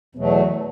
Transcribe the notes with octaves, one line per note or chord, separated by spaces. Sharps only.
E2 B2 F#3 A3 B3